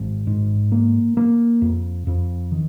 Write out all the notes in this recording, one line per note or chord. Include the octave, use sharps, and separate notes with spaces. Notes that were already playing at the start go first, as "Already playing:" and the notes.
Already playing: G#1
G#2
A#3
A#3
F2
F2
D#3